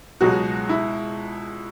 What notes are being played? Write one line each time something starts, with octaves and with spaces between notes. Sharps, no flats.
C#2 B2 F#3 G#3 F#4
E4